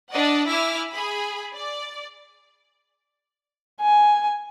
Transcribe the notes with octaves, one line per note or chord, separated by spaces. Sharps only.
D4 D5 D#5 F#5
E4 E5 G#5 D6 F6
G#4 B5
D5
G#5